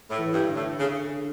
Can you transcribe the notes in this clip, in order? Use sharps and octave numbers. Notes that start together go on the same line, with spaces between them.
A2
E3
G2
D3
A2
C#3